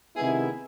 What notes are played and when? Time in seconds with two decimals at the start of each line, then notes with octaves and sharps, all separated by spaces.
0.16 C3 D#3 G#3 B3 E4 G#4